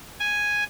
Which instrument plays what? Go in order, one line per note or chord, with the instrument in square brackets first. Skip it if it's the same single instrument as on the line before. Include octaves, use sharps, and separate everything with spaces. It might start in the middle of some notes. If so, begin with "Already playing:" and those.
[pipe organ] G#5